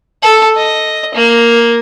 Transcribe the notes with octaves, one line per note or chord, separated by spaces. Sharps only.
A4
D#5
A#3